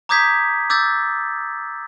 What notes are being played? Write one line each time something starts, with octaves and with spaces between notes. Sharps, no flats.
A#5 D6 D#6 G6 G#6 B6
D6 E6 G6 A6